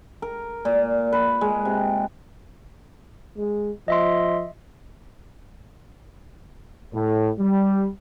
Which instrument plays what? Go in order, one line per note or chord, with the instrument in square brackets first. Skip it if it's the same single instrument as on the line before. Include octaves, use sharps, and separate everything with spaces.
[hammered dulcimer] A#4
A#2
B4
G#3
C3
[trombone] G#3
[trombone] F3 [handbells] D#5 E5 C6
[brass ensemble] A2
G3